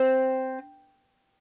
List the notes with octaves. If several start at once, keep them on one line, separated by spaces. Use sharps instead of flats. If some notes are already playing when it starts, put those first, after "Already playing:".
Already playing: C4